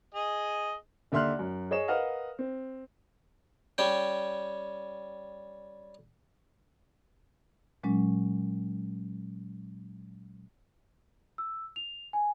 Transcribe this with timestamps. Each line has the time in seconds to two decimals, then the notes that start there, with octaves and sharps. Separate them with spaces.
0.14 G#4 D#5
1.12 D#2 D3 E5 C6 F6 F#6
1.39 F#2
1.71 G#4 C#5 D#5 E7
1.88 A#4 B4 D#5 F5 F#5 F6
2.39 C4
3.78 G3 C#4 G5
7.83 A#2 F#3 G#3 C#4
11.38 E6
11.76 F7
12.13 G#5